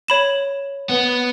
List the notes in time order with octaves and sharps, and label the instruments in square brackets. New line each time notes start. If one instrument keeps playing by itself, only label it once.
[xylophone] C#5 B5 E7
[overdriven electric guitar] B3